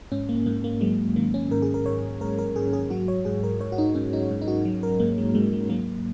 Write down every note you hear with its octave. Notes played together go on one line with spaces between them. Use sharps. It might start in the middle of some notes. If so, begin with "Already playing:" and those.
G#2 C#4
A#3
G#2 A#3
A#3
F#3 G#3
D#3 A#3
C#4
G#2 A#4
G#4
A#4
G#2 C#5
G#2 A#4
A#4
G#2 G#4
G#4
F#3 F#4
C#5
G#2 G#4
A#4
G#2 C#5
F#4
D#4
G#2 C#4
D#4
G#2
D#4
F#4
F#3
A#4
G#2 A#3
G#3
G#2 G#3
G#3
F#3 A#3